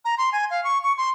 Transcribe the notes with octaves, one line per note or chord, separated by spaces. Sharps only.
A#5
C6
G#5
F5
C#6
C#6
C6